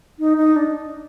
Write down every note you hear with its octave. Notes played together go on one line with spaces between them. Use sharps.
D#4
D#4
D4